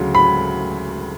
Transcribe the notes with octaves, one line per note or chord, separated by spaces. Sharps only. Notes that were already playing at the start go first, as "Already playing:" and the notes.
Already playing: D2 C#3 F#3
B5